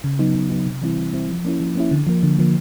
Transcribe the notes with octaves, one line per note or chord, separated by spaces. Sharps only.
C#3
F#3 B3 D#4
C#3
F#3 B3 D#4
C3
E3 G3 C4 E4
C3
E3 G3 C4 E4
F3
A#3 C#4 E4
F3
A#3 C#4 E4
D3
F3 A#3
D3
F3 A#3